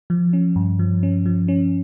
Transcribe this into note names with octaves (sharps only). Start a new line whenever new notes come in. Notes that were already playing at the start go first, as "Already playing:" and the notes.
F3
C#4
G2
F3
C#4
F3
C#4